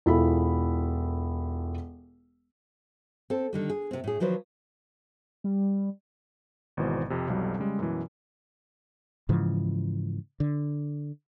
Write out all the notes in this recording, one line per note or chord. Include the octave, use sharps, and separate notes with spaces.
E1 E4 F4 A4 B5
C4 A4
D3 D#3 G3
G#4
C3 C4
A2 G#4
D#3 F3 F#3 B4 C5
G3
G#1 G#2 B2 E3 C5
F2 C3
B1 F2 F#3 G3
C#3 G3 G#3
F#2 B2 E3
G#2 C#3 E3 F3
D3